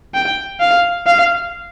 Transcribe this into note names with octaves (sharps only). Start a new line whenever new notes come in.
G5
F5
F5